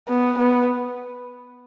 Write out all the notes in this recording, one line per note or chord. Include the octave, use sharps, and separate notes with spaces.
B3
B3